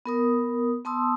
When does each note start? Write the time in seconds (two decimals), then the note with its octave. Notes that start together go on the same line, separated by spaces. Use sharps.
0.06 B3 A#4 D#6
0.85 B3 A5 C6 D#6 E6